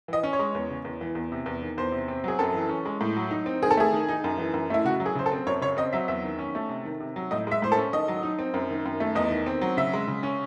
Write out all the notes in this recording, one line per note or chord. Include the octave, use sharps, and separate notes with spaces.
E3 D#5
C#4
C#5
G#3
E2
C#3
E2
E3
E2
C3
E2
D#3
E2 C5
C3
C4
F#3 G#4
F#2 A4
E3
C#4
G#3
A2
F#3
D#4
C4
D#3 G#4
A4
A3 G#4
D#3
D#4
F#2
E3
F#2
A3 E4
C#3 F#4
F#3
G#4
C#3 C5
A4
C4
F#2 C#5
C#3 C#5
C4 D#5
F#3 E5
E2 E5
D#3
C#4
A3
C3
D#3
C3
F#3
A2 D#5
G#3 E5
A2 C5
A4
C#4
D#3 D#5
F#3
D#4
C4
F#2
D#3
F#2
A3
E2 D#5
D#3
C4
F#3
C#3 E5
G#3
C#3
C#4